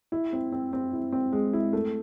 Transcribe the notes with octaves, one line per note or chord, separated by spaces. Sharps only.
E4
C4
C4
C4
E4
C4
G#3
E4
A3